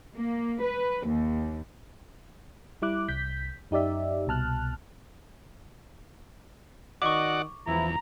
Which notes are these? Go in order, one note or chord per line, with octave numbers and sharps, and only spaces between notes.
A#3
B4
D#2
G3 E4 D6 F#6
C2 G6 B6
F#2 D#4 G4 D5 E5
C2 B2 A5 F6 F#6
D#3 F#4 D5 D#5 F#5 C#6 D6
E2 E3 F3 E4 A#5